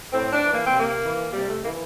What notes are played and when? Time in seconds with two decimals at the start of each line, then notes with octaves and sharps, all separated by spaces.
0.12 A2 C4
0.32 D4
0.43 E3
0.53 A#3
0.66 C4
0.73 C3
0.80 A#3
1.03 E3
1.33 C3 G3
1.49 A3
1.63 E3 A#3